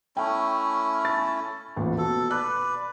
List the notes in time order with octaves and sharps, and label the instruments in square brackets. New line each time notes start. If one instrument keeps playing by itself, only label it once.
[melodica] A3 C#4 E4 [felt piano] G5
[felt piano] A6
D#1 A1 A#2
[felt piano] B2 [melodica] A4
[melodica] B4 D5 [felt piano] F#6